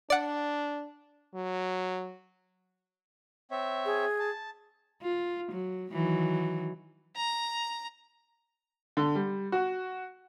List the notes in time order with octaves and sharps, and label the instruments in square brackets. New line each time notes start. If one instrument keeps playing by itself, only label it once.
[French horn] D4 [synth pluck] D5 F#5
[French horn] F#3
[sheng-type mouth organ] C4 C#5 E5
[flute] G#4
[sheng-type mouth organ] A5
[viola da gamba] F4
F#3
D#3 E3 F#3
[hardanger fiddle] A#5
[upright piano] D3
G3
F#4